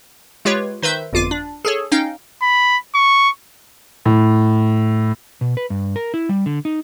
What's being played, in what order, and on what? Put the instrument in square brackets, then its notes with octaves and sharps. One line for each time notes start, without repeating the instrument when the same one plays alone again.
[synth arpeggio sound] G#3 F4 G4 B4 C#5
D#3 B4 C5 E5 G6
G1 F2 F4 D6 D#7
D4
G#4 A4 C#5
C#4 D#4 F5 G5
[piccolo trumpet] B5
C#6
[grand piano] A2
[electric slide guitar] B2
B4
G2
A#4
E4
G3
D3
D#4